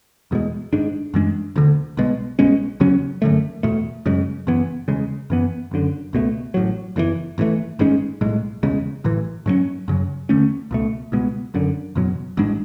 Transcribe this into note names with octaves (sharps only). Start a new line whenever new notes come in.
E1 E2 B2 G#3
G#1 G#2 G#3 D4
F#2 E3 G#3 D4
E1 D2 D3
B1 B2 G#3
B1 B2 G#3 C#4
E2 C#3 F#3 C#4
G#1 F#2 D3 A3
E2 B2 A3
F#2 C#3 G#3
F#1 F#2 E3 B3
E1 E2 C#3 G#3
F#2 E3 B3
F#1 F#2 D3
C#2 B2 F#3 A3
A1 A2 F#3
F#1 E2 C#3 E3
G#1 G#2 E3 A3
G#1 G#2 G#3 C#4
B1 A2 G#3
E1 E2 C#3 G#3
A1 A2 E3
G#2 F#3 A3 C#4
F#2 C#3 F#3
E2 D3 A3 C#4
C#2 B2 A3
C#2 B2 G#3 B3
G#1 F#2 D3
F#1 E2 B2 F#3
A1 G#2 G#3 D4